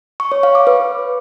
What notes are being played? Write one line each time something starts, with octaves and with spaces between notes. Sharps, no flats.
C#6
C#5
F5
D6
B4